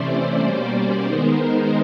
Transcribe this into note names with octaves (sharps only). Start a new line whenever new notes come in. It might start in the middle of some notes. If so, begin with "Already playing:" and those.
Already playing: C3 E3 A3 C#4 E4 C5 D5
B2 G3 A#3 C#4
D#3 G#3 B3 D#4 A#4 C5